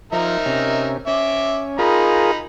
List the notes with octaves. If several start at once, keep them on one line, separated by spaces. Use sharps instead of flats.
F3 D#4 A#4 E5
C3 C#4
C#4 E5 D6
D#4 F4 G#4 A#4 B5